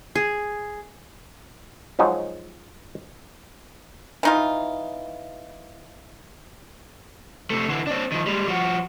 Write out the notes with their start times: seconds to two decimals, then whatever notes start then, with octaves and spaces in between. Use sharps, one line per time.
0.15 G#4
1.99 F3 F#3 G#3 D#4
4.23 E3 D#4 F4
7.50 C3 A3
7.68 D3 E3
7.87 C4 D4
8.12 D#3 F3
8.26 G3 G#3
8.48 F3 F#4